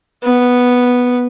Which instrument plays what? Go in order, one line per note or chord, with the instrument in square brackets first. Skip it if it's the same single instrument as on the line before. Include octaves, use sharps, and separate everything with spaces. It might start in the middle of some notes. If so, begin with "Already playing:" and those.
[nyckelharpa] B3